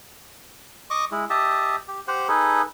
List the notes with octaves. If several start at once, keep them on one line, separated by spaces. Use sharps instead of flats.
D#5 C#6 D6
G#3 E4
G4 D#5 E5 A5
G4
G4 C5 F#5
D#4 G#4 A4 B4